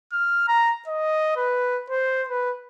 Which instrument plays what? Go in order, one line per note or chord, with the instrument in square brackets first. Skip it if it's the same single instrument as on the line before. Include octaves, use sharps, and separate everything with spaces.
[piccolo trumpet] F6
A#5
D#5
B4
C5
B4